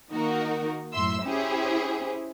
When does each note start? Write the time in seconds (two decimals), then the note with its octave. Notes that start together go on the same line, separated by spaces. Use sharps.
0.11 D#3 A#3 D#4 F#4 A#4
0.93 F#2 A2 E5 C6 E6
1.24 C#4 E4 G4 G#4 C5